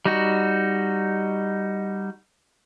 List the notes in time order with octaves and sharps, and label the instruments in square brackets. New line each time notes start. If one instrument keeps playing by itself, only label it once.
[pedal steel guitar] G3 D#4 F#4